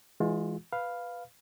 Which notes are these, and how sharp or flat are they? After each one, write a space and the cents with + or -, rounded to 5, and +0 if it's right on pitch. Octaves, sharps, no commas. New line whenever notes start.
E3 +0 G#3 +0 F4 +35
B4 +0 F5 +0